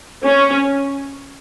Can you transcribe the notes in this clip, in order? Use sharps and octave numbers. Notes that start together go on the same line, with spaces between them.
C#4